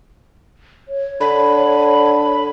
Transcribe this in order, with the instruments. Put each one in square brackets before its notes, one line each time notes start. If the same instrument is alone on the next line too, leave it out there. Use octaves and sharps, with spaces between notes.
[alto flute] C#5
[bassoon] D3 [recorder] B5